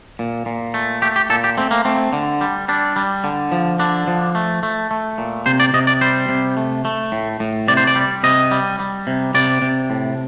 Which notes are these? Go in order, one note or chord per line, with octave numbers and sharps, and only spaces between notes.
A#2
A#2
A3
A3 G4
G4
A#2 A4
G4
A3 C4
A#3
A3 C4
D3
G3
G3 D4
G3
D3
F3
D3 D4
F3
A3
A3
A3
A#2
C3 C5
D5
C3 D#5
D5
G3 C5
C3
A3
A3
A2
A2
C3 D5
C5
D5
G3
C3 D#5
G3
G3
C3
C3 D5
C3
A2